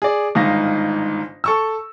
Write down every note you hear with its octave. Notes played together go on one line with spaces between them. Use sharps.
G#4 D5
G1 G#2 D#3 D#4 F5 A#6
A4 C#6 E6